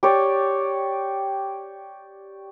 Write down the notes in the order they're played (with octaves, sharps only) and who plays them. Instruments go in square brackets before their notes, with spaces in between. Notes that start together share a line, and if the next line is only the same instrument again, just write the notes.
[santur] G4 C#5 D5